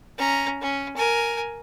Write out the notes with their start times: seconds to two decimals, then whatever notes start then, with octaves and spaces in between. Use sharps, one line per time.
0.18 C#4 A#5
0.61 C#4
0.96 A#4 G#5